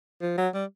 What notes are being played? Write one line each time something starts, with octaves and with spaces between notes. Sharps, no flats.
F3
F#3
G3